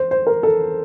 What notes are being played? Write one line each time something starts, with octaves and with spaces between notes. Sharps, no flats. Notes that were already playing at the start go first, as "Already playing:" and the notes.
Already playing: C5
C5
A#4
A4